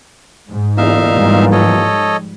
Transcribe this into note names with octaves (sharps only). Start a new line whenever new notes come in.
G#2
G1 E2 A#2 D#4 E5 F5
G#2 F3 G3
A4 C#5 D#5